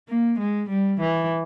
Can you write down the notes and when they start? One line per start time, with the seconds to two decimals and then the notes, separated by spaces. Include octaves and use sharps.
0.09 A#3
0.39 G#3
0.69 G3
1.01 E3